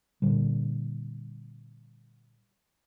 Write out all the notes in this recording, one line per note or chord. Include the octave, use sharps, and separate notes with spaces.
A#2 D3 G3